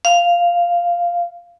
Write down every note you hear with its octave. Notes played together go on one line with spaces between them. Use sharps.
F5